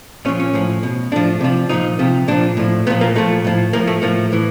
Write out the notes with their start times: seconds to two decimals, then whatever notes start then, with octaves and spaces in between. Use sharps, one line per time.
0.25 A#2 C#4
0.28 F3
0.40 C#4
0.54 A2 F3
0.83 B2
1.12 A2 F3 D4
1.40 C3 F3
1.69 A#2 F3 D#4
1.99 C3 F3
2.28 A#2 F3 D4
2.57 A2 F3
2.87 A#2 B3
2.90 F3
3.01 A#3
3.16 A#2 F3 A3
3.44 A2 F3
3.73 A2 F3 A#3
3.87 A3
4.02 A2 F3 A#3
4.32 A2 E3